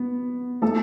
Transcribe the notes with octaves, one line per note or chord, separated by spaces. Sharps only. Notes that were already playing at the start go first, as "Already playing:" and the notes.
Already playing: B3
A3 A4